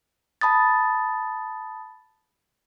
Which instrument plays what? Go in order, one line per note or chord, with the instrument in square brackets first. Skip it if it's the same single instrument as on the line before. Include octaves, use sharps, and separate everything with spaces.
[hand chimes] A5 B5 D#6 A6